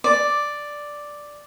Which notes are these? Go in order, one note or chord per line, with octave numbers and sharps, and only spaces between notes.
D5